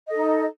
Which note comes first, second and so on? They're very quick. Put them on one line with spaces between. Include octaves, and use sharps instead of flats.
D#5 A4 D#4